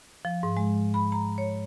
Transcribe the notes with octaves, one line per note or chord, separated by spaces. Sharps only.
F3
G#2
G#3
B5
A#5
C#5